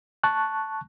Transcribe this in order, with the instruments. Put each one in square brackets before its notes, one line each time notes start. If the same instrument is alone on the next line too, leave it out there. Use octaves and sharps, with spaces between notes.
[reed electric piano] A5 C#6 F#6